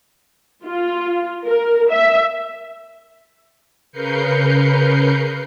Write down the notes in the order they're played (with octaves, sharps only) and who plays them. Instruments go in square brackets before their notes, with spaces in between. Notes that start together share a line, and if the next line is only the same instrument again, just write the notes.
[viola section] F4
A#4
E5
[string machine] C#3 A#4 B4 G6 C7 C#7